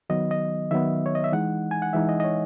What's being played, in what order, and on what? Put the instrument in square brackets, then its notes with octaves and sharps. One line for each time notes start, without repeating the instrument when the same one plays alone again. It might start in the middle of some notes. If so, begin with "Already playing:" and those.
[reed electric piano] D#3 F#3 B3 D#5
D#5
D#3 F#3 B3 E5
C#5
D#5
E5
E3 G#3 D#4 F#5
G#5
F#5
E3 G#3 D#4 E5
D#5
D#5
C#5